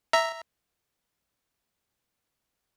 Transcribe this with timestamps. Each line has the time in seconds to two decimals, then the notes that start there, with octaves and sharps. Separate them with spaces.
0.13 E5 A#5